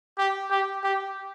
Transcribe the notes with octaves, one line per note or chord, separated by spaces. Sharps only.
G4
G4
G4